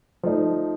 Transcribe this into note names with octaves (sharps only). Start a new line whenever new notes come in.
F3 A3 D#4